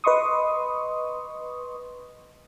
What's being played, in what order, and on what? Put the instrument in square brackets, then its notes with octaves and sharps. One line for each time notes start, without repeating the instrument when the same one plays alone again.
[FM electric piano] B4 D#5 C6 C#6 D#6